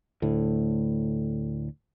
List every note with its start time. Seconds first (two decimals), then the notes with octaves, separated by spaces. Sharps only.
0.22 D2 A2